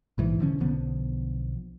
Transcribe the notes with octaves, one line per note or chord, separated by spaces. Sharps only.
A#1 G#2 E3
E1 D3 F3 C#4
B1 D3 F3 B3